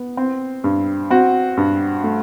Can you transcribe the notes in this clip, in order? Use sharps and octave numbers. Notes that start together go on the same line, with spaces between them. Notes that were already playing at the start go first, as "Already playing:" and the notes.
Already playing: B3
C4
G2
C4 F#4
G2
A3